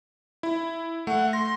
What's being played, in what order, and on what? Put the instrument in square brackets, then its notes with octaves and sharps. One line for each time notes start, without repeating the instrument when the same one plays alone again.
[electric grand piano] E4
[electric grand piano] A3 [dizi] F#5
[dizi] C6 [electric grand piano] A#6